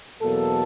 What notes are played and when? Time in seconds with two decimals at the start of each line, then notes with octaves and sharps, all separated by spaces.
0.21 E2 B2 F#3 A#3 A4